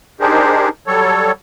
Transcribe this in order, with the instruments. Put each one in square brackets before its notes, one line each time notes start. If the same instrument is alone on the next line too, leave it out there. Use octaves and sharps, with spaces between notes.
[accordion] D4 D#4 G4 G#4 A#4 C5
F#3 G3 A4 C#5